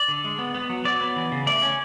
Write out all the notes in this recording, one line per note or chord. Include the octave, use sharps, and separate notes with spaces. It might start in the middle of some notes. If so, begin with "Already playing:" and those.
Already playing: D5
D3
G#3
B3
B3
F#3
F#3 D5
B3
E3
C#3
A3 D5
C#4